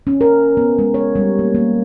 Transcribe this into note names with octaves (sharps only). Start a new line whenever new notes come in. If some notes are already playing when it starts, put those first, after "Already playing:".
C#4
A#4
B3
G#3
C#5
G3
A#3
A#3